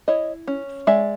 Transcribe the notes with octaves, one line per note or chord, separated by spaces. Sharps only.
E4 C#5 D#5
C#4
G#3 D5 E5